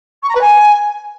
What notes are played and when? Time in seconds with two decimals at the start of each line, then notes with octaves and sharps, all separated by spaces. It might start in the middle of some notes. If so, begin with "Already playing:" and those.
0.22 C#6
0.29 A#5
0.35 B4
0.41 G#5